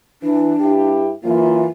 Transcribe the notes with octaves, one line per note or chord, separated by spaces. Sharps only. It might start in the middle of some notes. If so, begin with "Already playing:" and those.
E3 D4
G2 E4 G4
F#2 E3 A#3 F4